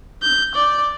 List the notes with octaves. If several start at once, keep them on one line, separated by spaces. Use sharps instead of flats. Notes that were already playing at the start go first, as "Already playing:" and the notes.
G6
D5